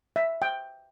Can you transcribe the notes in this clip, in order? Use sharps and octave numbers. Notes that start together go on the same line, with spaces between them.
E5
G5